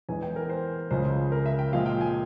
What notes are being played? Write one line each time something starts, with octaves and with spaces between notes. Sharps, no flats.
E2 E3 G#3 G#5
G5
A#4
C5
C#2 C#3 F3 G#3 C5
A#4
E5
G5
A#2 F3 G#3 F5
G5
G#5